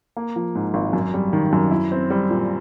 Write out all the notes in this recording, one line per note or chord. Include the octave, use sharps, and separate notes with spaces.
A#3
F3
G#2
G#1
F#2
G3
D#3
F#2
E4
C4
G3
A#2